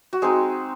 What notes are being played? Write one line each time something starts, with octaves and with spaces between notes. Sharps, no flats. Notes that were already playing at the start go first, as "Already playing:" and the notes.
F#4
G#3 C4 D#4 G#4